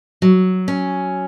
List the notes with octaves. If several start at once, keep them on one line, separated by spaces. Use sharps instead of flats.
F#3
C#4